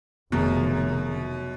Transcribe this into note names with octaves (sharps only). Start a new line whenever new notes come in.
F1 F#2 B2 D#3 G#4 A#5